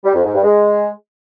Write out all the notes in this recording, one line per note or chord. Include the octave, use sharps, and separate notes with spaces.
G3
F2
G#2
G2
G#3